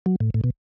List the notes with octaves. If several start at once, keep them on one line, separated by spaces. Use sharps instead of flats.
F#3
A2
A2
B2